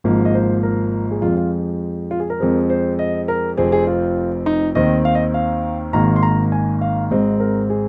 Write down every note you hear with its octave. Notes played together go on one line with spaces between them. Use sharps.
G#1 G#2 F3 A#3
D#5
C5
A#4
G#4
F2 F3 G#3 F4
F4
F4
G#4
A#4
F2 F3 G#3 C4
C5
D#5
A#4
F1 F2 F3 C4 G#4
G#4
F4
D#4
D#2 D#3 C4 D#5
F5
D#5
F5
G#1 G#2 D#3 A#3 A#5
C6
A#5
G#5
F5
G#1 G#2 G#3 C4 D#5
A#4
G#4